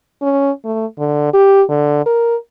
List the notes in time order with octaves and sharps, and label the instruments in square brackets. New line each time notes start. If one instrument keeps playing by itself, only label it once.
[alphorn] C#4
A3
D3
G4
D3
A#4